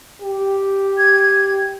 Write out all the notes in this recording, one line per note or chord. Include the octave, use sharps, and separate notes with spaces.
G4
G#6